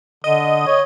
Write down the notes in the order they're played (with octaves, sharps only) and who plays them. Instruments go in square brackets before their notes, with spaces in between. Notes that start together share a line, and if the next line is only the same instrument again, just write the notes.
[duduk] D3 [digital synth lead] D#5
[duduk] C#5